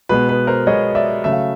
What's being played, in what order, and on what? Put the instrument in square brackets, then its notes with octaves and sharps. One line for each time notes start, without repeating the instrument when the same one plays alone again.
[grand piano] B2 G#3 B3 B4
B4
A#4 C5
B2 G#3 B3 C#5 D#5
D5 E5
C#3 F#3 A3 E5
F5